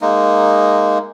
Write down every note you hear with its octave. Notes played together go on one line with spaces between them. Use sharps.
G#3 A#3 D#4